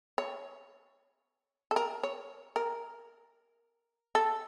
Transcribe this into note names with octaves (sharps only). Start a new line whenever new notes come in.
C#5
A4
A#4
C#5
A#4
A4